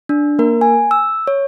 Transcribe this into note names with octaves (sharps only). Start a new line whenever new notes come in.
D4
A#3 A#4
G#5
E6
C#5